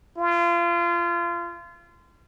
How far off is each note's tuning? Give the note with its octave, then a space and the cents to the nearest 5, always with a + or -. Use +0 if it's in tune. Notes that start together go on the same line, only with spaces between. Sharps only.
F4 -30